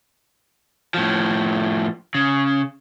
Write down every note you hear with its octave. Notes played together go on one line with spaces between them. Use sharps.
A2 F3
C#3